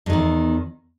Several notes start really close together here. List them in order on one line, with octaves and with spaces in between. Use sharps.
G2 D#3 E2